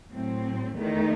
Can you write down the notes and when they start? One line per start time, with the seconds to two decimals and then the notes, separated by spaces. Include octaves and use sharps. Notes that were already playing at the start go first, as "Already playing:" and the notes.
0.11 A2 F#3 C4
0.75 E2 D#3 A3 D#4